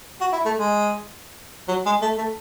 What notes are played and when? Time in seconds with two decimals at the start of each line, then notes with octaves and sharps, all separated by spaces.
0.21 F#4
0.33 E4
0.45 A3
0.57 G#3
1.68 F#3
1.86 G#3
2.02 A3
2.18 A3